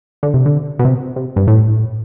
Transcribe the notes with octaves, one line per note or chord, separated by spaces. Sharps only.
D3
C3
D3
B2
C3
C3
G2
A2